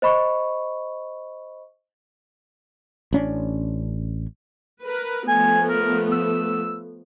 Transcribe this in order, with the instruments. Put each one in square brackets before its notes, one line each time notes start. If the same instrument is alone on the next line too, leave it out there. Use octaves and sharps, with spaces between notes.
[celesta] C5 D#5 B5 C#6
[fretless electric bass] A1 C#4 D4
[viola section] A#4 B4
[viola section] F3 A3 B3 [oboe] G#5
[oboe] A#4
E6